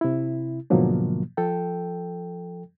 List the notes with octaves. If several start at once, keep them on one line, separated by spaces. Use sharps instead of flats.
C3 E4
G#2 B2 D3 F3 F#3 A#3
F3 A4 G5